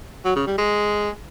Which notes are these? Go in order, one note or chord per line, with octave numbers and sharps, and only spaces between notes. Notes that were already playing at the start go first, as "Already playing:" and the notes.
F#3
C#3
G3
G#3